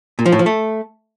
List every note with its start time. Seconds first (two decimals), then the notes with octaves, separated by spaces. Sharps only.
0.19 A#2
0.26 F3
0.32 A2
0.39 F3
0.46 A3